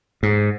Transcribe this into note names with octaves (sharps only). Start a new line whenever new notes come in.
G#2